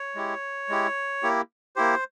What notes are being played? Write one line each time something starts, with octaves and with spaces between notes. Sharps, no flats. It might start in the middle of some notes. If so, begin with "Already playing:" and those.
Already playing: C#5
G#3 E4 G4
G#3 E4 G4
A#3 E4 G4
A#3 E4 G4 C5